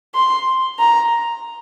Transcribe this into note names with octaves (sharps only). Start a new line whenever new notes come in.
C6
A#5